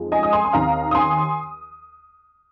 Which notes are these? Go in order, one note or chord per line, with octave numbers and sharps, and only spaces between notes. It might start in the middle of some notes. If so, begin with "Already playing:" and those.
Already playing: F2 F3 G#3 D#4
D#5 G#5
D#6
G#5 C6
C6
D#2 D#3 C4 F5 A#5
D#6
G#5 C6